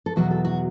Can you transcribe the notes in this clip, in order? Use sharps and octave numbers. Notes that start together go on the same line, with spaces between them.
A4
E2 B2 F#3 F#4
A4
F#4